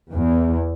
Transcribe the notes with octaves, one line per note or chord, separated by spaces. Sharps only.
E2